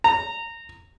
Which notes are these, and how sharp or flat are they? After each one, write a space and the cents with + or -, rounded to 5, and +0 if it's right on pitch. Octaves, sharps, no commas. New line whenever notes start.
A#5 -20